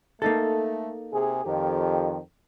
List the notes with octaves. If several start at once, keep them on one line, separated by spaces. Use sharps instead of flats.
A3 A#3 D#4 A4
C3 G#4
F2 D#3 G4